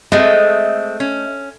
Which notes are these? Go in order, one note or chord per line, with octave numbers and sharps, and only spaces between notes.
G#3 A3 C4 D#5
C#4